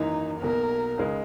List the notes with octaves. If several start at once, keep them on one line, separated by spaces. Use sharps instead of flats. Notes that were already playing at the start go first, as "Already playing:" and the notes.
Already playing: G#1 F#2 E3 A#3 D#4
B1 B2 A#3 A#4
C#2 C#3 G#3 D#4 A#4